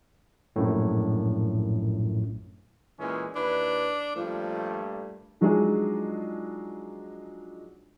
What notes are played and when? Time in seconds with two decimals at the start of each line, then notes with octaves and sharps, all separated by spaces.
0.56 A#1 F#2 A2
2.99 A#2 E3 G#3 C#4
3.35 D#2 D4 E4 B4
4.16 G2 A#2 F3 A3
5.41 F3 F#3 G#3 D4 D#4 G#4